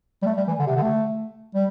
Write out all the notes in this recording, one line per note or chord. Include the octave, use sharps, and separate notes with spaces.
G3
A3
G3
E3
D3
C3
D3
A3
G3